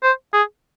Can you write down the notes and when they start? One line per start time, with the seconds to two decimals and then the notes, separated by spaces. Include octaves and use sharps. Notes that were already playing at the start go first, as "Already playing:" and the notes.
0.03 C5
0.33 G#4